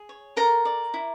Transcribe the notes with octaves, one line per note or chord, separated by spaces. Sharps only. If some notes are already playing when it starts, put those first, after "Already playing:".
Already playing: G#4
C#5
A4 A#4 A#5
D5
E4